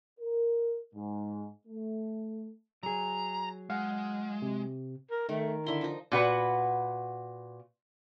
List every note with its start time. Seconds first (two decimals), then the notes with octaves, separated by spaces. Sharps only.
0.20 A#4
0.95 G#2
1.68 A3
2.83 F#3 G#4 A#5
3.70 G#3 F5 F#5
4.42 C3
5.11 A#4
5.29 D#3 A3
5.67 D3 E4 C6
5.81 F3 D#4
6.12 A#2 F#4 B4 F#5